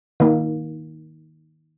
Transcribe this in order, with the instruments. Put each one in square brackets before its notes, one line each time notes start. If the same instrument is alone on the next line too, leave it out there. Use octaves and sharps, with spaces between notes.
[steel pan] D#3 A#3